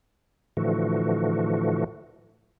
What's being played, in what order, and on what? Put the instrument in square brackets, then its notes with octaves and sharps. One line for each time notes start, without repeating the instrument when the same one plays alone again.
[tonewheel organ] A2 D3 E3 F3 A3 F#4